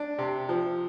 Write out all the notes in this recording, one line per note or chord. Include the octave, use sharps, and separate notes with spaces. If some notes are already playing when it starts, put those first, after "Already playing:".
Already playing: D4
C3
F3